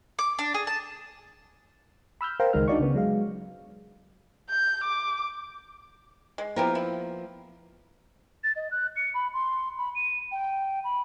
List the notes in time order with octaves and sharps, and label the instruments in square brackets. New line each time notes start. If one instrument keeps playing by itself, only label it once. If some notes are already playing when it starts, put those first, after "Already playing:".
[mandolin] D6
D4
G#4
A5
[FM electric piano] B5 E6 F6 G6
A#4 C5 F5 G5 A#5
C#2 D#3 G#3 D#4 A#4 F6
D4 D#4 F#4 D5 F5 C#6
C#3 B3
F#3 G#3 F5
[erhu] G6
D6
[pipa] G#3
[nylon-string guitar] F3 A#3 B3 [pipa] E4 G4 A#4
[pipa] E4
[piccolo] A6
D#5
F#6
C#7
B5
C6
B5
D#7
G5
B5